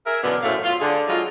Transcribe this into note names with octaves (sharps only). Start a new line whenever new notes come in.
G#4 A#4 E5
F#2 B2 D3 E3 B3
F#2 A2 A3 C5 F5
F4
D3 G#4
F#3 G#3 D#4 F4